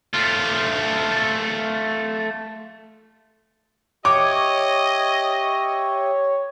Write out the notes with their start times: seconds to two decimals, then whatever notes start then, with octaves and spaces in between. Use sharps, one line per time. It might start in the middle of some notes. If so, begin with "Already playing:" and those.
0.14 A3 F4
4.05 G4 C#5 D#5 E5 D6